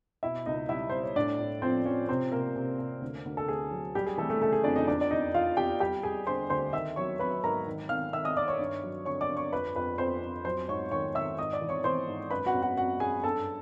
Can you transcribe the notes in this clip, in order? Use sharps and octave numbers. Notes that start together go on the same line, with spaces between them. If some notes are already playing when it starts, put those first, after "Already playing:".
B2 E4 E5
C#2 D#4 D#5
G3 E4 E5
G3 C5
C#5
A2 D4 D5
A2
F3 C4 C5
F3 C#4 C#5
C3 C4 C5
C3 A#3 A#4
C3
C3
D2
D2
A4
D2 G#4
F#3
G3 G4
G#4
E3 A3 A4
A3 A4
C#3 A3 A4
G#4
F2 D4 D5
D#4 D#5
E2 D4 D5
D5
E2 D#4 D#5
E2 F4 F5
E2 G4 G5
G3 G4 G5
G3 G#4 G#5
D3 C5 C6
D2 C5 C6
D#3 E5 E6
F#3 C#5 C#6
F#3 B4 B5
G#2 A#4 A#5
D#3
D#3 F5 F6
D#3 E5 E6
D#5 D#6
D#3 D5 D6
C#5 C#6
G2
F#3
D3 C#5 C#6
D5 D6
G2
C#5 C#6
F2 B4 B5
F2 B4 B5
F2 C5 C6
F2
F#3 C5 C6
G#2 C#5 C#6
D#3 C#5 C#6
D#3 E5 E6
G#2 D#5 D#6
D5 D6
E3
C#5 C#6
E3 C5 C6
G#2
F#2 B4 B5
F#4 F#5
F#2
F#4 F#5
F#2 F#4 F#5
F#2 G#4 G#5
G2 A4 A5